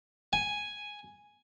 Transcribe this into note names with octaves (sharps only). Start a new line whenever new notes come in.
G#5